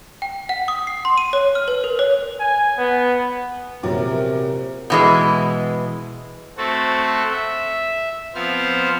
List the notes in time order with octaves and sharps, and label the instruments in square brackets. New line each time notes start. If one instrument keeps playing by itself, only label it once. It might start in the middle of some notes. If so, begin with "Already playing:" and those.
[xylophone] G5
F#5
D#6
C7
C6
D#7
C#5
F6
B4
A#4
C#5
[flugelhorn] G#5
B3
[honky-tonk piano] A#1 F#3 D6 [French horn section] E2 A#3 A#4 [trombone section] C3
[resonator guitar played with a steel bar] B2 E3 G#3
[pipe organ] A3 C4 F#4 A4
E5
F3 B3 C4 C5 F6